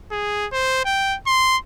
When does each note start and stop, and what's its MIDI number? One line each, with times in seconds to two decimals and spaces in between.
0.12 0.46 68
0.52 0.84 72
0.85 1.17 79
1.27 1.57 84